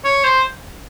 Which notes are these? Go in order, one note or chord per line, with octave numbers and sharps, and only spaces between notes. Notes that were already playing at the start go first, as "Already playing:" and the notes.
C#5
C5